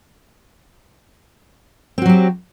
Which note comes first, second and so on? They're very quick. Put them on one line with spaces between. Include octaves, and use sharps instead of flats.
C4 F#4 F#3 G4